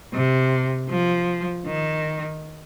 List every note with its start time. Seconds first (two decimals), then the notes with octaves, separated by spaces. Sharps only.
0.13 C3
0.89 F3
1.67 D#3